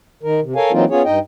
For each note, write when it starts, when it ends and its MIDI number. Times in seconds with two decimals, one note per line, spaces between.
0.23 0.40 51
0.23 0.40 70
0.43 0.54 48
0.56 0.72 69
0.56 0.72 70
0.56 0.72 73
0.56 0.72 77
0.56 0.72 80
0.72 0.85 52
0.72 0.85 54
0.72 0.85 58
0.72 0.85 60
0.72 0.85 63
0.72 0.85 65
0.90 1.02 59
0.90 1.02 61
0.90 1.02 65
0.90 1.02 68
0.90 1.02 73
1.05 1.19 43
1.05 1.19 63
1.05 1.19 75
1.05 1.19 79